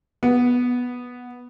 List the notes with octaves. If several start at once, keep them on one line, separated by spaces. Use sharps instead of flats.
B3